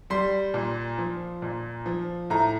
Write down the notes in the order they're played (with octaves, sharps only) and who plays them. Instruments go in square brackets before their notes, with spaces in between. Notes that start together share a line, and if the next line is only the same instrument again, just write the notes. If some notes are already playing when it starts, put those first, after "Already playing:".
[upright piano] G3 C6
A#2
F3
A#2
F3
A2 A#5